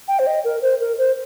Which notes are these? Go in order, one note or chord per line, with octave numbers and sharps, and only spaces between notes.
G5
C5
D#5
A#4
C5
A#4
C5